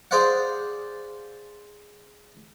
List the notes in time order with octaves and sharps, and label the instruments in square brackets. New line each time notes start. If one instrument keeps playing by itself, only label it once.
[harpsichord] G#4 C5 D5 F5 F#5